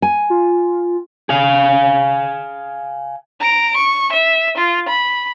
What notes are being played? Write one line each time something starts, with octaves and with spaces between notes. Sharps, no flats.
G#5
F4
G#4 F5
A#5 D7
C#6
E5
F4
B5